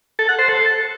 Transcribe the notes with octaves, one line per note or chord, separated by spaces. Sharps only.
A4
F#5
C5
A4